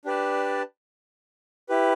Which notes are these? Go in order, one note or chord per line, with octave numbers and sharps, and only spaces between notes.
D4 G4 B4 D5 A5
E4 G4 B4